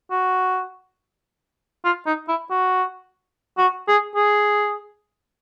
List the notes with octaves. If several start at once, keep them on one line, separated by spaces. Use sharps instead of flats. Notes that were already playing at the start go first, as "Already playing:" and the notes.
F#4
F4
D#4
E4
F#4
F#4
G#4
G#4